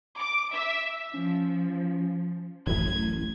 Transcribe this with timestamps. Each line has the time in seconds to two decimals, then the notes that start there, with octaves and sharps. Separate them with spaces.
0.18 D6
0.52 E5
1.14 F3 C#4
2.67 D1 A1 F#2 A2 G#6